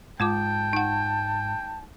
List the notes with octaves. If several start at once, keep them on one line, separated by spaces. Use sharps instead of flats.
G#2 G#3 F4 G5 A5 D6
D#4 F#5